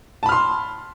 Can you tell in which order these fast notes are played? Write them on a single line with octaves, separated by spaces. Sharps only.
A5 B5 F6 C6